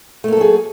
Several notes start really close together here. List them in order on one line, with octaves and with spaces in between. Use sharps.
A3 A#3 A4 F#3 G#4